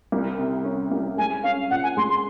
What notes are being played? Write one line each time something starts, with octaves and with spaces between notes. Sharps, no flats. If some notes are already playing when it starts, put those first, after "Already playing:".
C2
C3
C#4
C2
G#3 G#5
C#4 F5
A#2 F#5
G#5
G#3 C6
C6